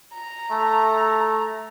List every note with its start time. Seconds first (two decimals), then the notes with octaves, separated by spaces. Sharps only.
0.14 A#5
0.51 A3